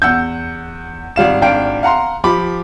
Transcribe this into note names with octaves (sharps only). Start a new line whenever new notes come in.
E2 F#5 E6 G6
G#1 G3 F5 E7
G#1 D4 F5 G5 D7
F5 F#5 A#5 C6
F3 G4 B5 D6